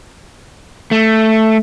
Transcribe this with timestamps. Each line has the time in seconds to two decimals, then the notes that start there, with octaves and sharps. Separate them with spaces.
0.91 A3